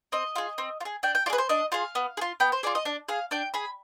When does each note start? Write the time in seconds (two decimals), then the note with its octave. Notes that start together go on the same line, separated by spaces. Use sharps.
0.12 C4 D#5
0.36 F4 G#4
0.58 C4
0.81 F4
0.85 G#4
1.03 D4 G5
1.15 G5
1.26 F4 D5
1.30 G#4 B4
1.38 C5
1.49 D4 D#5
1.72 F4 G#4 F5
1.95 B3
2.17 G#4
2.21 F4
2.40 B3 G5
2.52 C5
2.63 F4 G#4 D5
2.75 D#5
2.85 D4
3.09 G#4 F5
3.31 D4 G5
3.54 G#4 B5